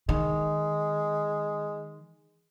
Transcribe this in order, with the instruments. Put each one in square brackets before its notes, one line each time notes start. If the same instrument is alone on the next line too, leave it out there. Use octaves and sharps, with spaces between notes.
[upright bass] D#3 [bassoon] G#3